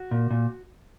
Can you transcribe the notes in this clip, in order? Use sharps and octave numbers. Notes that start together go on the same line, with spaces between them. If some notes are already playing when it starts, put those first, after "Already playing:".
Already playing: F#4
A#2
A#2